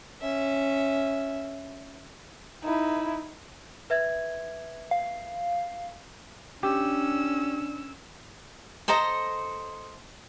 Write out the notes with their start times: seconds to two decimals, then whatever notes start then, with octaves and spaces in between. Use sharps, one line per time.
0.22 C#4 E5
2.64 D#4 E4
3.90 B4 E5 G#6
4.91 F5
6.63 C#4 D4 G4 E6
8.88 A4 C5 D#5 A#5